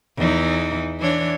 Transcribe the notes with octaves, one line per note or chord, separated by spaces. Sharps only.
E2 E3 D#4
E3 D4 C#5